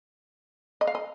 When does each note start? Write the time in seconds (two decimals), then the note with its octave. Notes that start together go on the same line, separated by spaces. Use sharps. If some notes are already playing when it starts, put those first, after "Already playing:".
0.81 D#5
0.87 F5
0.95 D#5